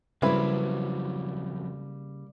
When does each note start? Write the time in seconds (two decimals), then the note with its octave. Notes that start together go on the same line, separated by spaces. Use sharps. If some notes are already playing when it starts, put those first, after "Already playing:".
0.22 F2 C#3 F#3 G3 A#3 C4 E4 B4